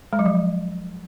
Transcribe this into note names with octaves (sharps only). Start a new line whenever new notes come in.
G#3
F#3
F3